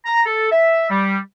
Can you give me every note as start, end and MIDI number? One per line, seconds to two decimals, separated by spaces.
0.05 0.22 82
0.26 0.52 69
0.52 0.89 76
0.90 1.18 55